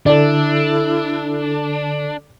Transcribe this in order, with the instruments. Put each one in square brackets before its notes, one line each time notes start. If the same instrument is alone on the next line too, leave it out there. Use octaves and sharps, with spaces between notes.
[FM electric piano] D3 A4 [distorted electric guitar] D4 [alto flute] E4 [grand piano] D5